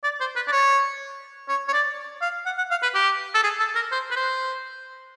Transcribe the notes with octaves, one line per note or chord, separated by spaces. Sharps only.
D5
C5
B4
D5
C#5
C#5
C#5
D5
F5
F#5
F#5
F5
B4
G4
A4
G#4
A4
A#4
C5
B4
C5